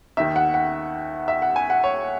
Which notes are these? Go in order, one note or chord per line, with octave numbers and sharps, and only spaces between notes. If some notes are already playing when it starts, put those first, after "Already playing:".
D#2 D#3 E5
F#5
F#5
E5
F#5
G#5
F#5
C#5